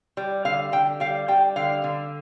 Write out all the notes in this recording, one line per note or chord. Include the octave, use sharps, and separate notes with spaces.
G3
D3 F5
D3 G5
G3 F5
G3 G5
D3 F5
D3